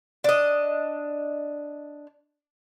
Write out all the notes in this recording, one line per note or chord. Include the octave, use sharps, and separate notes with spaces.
D4 D#5